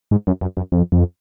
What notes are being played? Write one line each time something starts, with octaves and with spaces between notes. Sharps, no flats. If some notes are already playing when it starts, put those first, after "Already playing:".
G#2
F#2
F#2
F#2
F2
F2